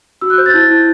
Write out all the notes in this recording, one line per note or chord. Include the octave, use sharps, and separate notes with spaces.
F#4 E6
F#6
C5 G6
A6
E4
E4